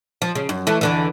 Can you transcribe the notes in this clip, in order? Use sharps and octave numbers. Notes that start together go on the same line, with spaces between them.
F3
C#3
F#2
E3 A3
E2 D3 E3